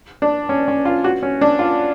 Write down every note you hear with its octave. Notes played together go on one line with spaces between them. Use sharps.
D4
C#4
C#4
F4
F#4
C#4
D4
F4